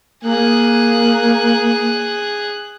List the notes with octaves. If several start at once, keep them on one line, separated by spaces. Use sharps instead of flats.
A#3 G#4 F#6